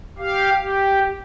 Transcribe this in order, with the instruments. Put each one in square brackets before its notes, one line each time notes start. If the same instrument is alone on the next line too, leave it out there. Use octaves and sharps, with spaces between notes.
[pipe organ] G4 F5
G4